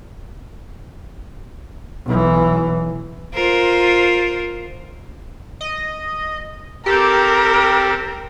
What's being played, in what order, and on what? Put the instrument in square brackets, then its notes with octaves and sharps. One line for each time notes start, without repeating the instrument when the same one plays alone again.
[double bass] B1 E3
[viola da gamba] F4 A#4 C5
[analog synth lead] D#5
[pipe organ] C4 A4 [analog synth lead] G4 [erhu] A#4